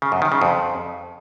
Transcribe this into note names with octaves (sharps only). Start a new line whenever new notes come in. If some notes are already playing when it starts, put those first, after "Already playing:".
C#3
F#2
D#3
C#3
F2